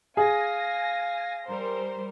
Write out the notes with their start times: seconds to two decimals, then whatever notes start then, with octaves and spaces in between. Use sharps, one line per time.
0.17 G#4 F5 G#5 A#6
1.47 G3 A#4 C5